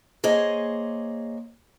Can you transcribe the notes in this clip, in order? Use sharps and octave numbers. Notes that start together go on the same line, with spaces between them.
A#3 G#4 C5 C#5 D#5